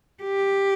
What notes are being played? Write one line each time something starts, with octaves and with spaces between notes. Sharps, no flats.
G4